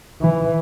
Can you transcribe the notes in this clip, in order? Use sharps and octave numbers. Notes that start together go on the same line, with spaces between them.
E3